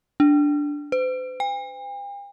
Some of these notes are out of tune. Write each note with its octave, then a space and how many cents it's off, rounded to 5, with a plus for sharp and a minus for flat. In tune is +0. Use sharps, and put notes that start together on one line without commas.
D4 -5
C5 -45
G5 +45